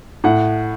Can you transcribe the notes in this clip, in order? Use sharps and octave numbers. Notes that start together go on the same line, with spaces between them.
A2 F#5